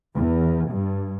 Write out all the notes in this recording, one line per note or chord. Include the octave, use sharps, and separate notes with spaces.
E2
G2